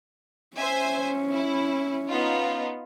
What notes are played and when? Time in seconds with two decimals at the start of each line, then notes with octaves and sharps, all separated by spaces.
0.57 C#4 C5 E5 G#5
1.31 E4
2.09 B3 D#4 F4